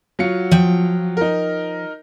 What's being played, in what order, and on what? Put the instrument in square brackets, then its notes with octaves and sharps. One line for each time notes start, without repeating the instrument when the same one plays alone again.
[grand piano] F#3 F4 C#7
[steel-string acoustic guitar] F3 G5
[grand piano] D#4 A#4